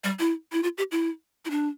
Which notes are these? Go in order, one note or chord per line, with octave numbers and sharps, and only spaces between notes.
G3
E4
E4
F4
G4
E4
E4
D4